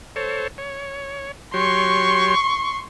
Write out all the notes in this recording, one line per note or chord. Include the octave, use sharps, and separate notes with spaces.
A4 C5 C#5
C#5
F#3 G4 C#5 C6 C#6